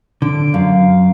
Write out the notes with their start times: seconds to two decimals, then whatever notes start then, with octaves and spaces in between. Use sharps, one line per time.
0.22 D3 D7
0.54 F#2 F5